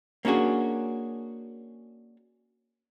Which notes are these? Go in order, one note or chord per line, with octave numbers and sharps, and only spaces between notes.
A#3 C#4 D4 F#4 G#4